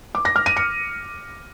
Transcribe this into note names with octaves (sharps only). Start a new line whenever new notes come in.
D6
A#6
F6
D#7
C#7